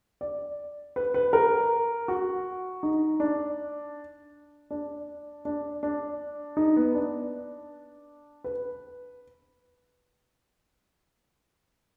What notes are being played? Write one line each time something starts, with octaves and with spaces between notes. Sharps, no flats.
D5
B4
B4
A#4
F#4
D#4
D4
D4
D4
D4
D#4
B3
D4
B4